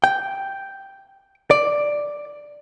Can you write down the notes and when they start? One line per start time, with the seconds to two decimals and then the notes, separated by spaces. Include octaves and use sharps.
0.04 G5
1.51 D5